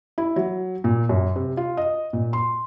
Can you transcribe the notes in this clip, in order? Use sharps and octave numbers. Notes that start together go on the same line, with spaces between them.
E4
F#3
A#2
F#2
C3
F4
D#5
A#2
C6